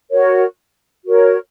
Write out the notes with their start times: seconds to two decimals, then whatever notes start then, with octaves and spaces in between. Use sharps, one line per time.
0.10 F#4 A#4 C#5
1.04 F#4 A#4 C#5